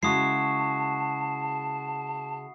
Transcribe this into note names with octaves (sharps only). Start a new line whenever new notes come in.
C#3 G#3 E4 F#4 A5 D#6 C7